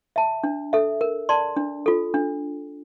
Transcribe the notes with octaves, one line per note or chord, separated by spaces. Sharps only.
E5 A5
D4
A4 E5
A#4
D5 A5 C6
D4
F4 A4
D4